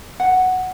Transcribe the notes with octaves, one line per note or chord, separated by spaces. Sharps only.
F#5